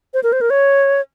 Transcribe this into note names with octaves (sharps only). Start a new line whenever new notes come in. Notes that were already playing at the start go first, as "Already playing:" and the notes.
C5
A#4
C5
A#4
C#5